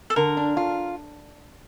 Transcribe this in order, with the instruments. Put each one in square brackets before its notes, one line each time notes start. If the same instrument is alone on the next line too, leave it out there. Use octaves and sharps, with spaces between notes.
[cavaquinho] A4
[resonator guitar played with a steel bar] D3 [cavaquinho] A#4
[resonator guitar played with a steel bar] D4
F4